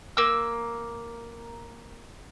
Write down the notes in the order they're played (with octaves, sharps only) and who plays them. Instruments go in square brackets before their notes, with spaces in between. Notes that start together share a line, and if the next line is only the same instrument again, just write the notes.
[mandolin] A#3 E6